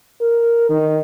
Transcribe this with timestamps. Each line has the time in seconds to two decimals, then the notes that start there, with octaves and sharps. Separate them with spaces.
0.21 A#4
0.70 D#3